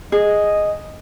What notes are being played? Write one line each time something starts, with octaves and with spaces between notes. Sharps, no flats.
G#4 D#5